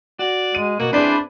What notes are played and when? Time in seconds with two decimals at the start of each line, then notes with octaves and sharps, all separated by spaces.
0.19 F#4 D5
0.55 G#3 D#7
0.80 B2 A#3 F#4
0.93 C4 D4 E4 G#4 B4 C5 D5 B5